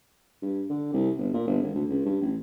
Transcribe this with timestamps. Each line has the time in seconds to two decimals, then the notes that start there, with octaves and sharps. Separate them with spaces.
0.42 G2
0.69 D3
0.93 C2
1.18 G1
1.34 A#2
1.47 G1
1.62 G#1
1.75 D2
1.89 C#2
2.05 G2
2.21 A1